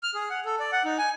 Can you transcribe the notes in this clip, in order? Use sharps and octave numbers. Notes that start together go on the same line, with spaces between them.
F6
G#4
F#5
A4
D5
F#5
D#4
G#5